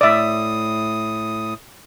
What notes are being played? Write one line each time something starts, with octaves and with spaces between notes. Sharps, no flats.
A2 D5 E5 D#6